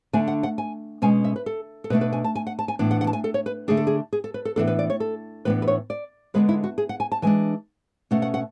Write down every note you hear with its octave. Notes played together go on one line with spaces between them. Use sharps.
D3 A3 D4 G#5
F#5
F#5
G#5
B2 G#3 C#4 G#5
E5
B4
A4
A4
B2 A3 D4 B4
B4
G#5
A5
G#5
F#5
A5
G#5
A2 E3 B3 D4
F#5
F#5
A5
G#5
A4
C#5
B4
D3 A3 D4 G#4
A4
G#4
G#4
A4
B4
A4
A2 E3 B3 D4 A4
B4
D5
C#5
A4
A2 E3 B3 D4 B4
B4
C#5
D5
D3 G#3 B3 D4 B4
E4
F#4
G#4
F#5
G#5
A5
E3 G#3 D4 G#5
B2 A3 C#4 F#5
F#5
F#5